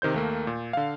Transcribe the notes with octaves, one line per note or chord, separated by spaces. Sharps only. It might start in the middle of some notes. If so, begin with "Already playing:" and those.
C3 D#3 C5 G6
D#2 A3 A#3
A#2
D3 F5